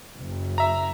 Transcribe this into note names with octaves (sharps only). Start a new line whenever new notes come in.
F#1
E5 A#5